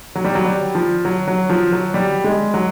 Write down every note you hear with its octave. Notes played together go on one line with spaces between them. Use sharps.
F#3
G3
F#3
G3
F3
F#3
F#3
F3
F#3
G3
G#3
F#3